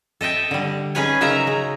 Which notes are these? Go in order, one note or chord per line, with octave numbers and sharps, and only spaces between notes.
A4 D#5 E5 G5
D3 G3
C#4 D#4 G#4 B4 C#5 G#5
C#3 F#3 D#4 A#4 E5 A#5
G#3